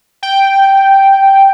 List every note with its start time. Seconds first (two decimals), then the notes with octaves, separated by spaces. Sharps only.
0.23 G5